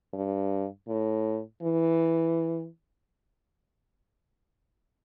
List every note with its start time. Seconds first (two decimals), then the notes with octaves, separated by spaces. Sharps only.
0.14 G2
0.87 A2
1.63 E3